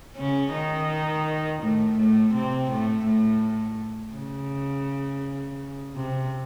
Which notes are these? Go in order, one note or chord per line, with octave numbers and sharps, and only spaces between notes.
C#3 C#4
D#3 D#4
A2 A3
A2 A3
C3 C4
A2 A3
A2 A3
C#3
C3